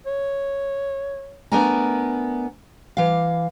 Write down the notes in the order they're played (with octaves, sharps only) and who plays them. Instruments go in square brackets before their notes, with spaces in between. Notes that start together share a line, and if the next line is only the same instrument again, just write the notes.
[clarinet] C#5
[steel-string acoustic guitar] A3 B3 D4 A#4 G#5 A#5
E3 F5